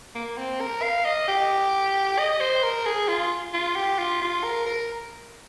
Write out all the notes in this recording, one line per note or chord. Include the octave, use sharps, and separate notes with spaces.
A#3
C4
A#4
F5
D#5
G4
D#5
C5
A#4
G#4
F4
F4
G4
F4
F4
A#4
A#4